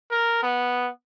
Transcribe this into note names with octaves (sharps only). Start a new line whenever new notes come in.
A#4
B3